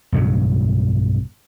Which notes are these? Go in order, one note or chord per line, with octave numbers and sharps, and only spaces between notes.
B1 G2 C#3 F#3